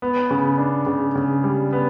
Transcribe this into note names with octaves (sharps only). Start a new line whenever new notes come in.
B3
C#3
D4
C#3
C#3
G3
B3